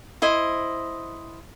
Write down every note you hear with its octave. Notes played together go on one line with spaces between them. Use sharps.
E4 C5 D#5